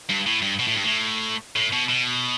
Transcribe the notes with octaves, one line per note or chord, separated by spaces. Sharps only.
G2
A2
G2
B2
A2
G2
A2
A2
B2
B2